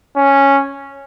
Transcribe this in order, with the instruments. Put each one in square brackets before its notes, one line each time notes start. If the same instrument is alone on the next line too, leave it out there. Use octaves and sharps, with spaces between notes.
[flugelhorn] C#4